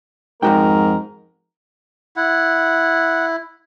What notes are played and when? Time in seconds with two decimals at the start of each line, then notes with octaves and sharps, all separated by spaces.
0.42 F2 G#2 F#4 A#4 G5
2.16 E4 F#5